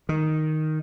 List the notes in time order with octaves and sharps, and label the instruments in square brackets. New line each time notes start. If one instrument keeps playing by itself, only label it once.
[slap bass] D#3